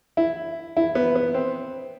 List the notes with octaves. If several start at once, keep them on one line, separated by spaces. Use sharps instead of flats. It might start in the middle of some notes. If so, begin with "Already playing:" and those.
E4
E4
B3
B3
C4